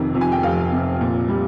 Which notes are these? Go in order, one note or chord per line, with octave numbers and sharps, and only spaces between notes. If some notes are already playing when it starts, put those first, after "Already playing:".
Already playing: F1 F2 C3 D#3
F2
G#5
G5
F1 F5
C3
A#2
G3